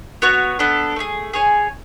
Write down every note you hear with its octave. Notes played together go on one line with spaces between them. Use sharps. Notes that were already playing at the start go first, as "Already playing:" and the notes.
B3 F#4 C#5
B3 D4 A4
A3 E4 G#4
G#4 C#5 G#5